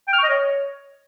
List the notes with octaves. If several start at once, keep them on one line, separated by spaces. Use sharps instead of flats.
G5
F6
C#6
D#5
C#5